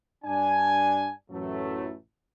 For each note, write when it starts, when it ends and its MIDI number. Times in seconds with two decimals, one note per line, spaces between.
0.25 1.09 43
0.25 1.09 62
0.25 1.09 80
1.30 1.93 33
1.30 1.93 42
1.30 1.93 45
1.30 1.93 52
1.30 1.93 54
1.30 1.93 57